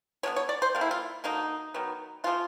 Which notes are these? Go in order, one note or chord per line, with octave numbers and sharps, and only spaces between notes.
D3 G3 B3 C#5
C#5
D5
C5
D3 G3 A#3
E4
F4
D3 F#3 A#3 D#4
D#3 F#3 B3
C#3 F3 A3 F4